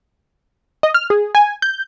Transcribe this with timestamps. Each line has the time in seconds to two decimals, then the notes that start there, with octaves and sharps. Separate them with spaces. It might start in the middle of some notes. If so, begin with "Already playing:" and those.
0.83 D#5
0.94 F6
1.10 G#4
1.35 G#5
1.62 G6